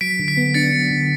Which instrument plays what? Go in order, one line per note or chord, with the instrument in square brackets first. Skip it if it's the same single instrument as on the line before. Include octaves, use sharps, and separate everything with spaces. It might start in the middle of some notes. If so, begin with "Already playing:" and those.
[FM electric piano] F#3 [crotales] B6 D7
[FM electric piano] D3
[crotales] B6
[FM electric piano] B3
[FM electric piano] D4 [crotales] A6 C#7
[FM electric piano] F#3
D3